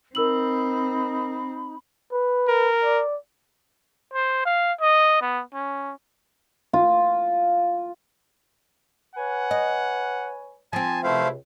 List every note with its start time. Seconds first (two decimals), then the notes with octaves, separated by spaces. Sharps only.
0.15 C4 D#4 A#4 B5 E6 F#7
2.12 B4
2.48 A#4
2.84 D5
4.13 C5
4.45 F5
4.81 D#5
5.21 B3
5.54 C#4
6.73 F4
9.16 B4 C#5 F#5 G#5
9.51 D#5
10.73 F3 C4 G#5 A5
11.04 C#2 C3 A3 E4 C5 F5